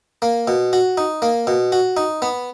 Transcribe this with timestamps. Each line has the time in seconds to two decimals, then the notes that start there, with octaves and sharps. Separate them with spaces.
0.22 A#3
0.48 B2
0.73 F#4
0.97 D#4
1.22 A#3
1.47 B2
1.72 F#4
1.97 D#4
2.22 B3